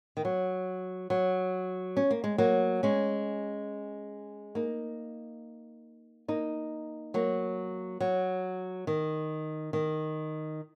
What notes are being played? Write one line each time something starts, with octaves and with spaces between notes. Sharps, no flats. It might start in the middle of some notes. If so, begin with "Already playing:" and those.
D#3
F#3
F#3
C#4
A#3
G#3
F#3 A#3
G#3 C#4
A#3 D#4
A#3 D#4
F#3 A#3
F#3
D#3
D#3